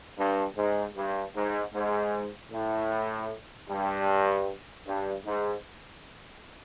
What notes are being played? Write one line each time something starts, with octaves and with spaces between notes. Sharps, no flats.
G2
G#2
G2
G#2
G#2
A2
G2
G2
G#2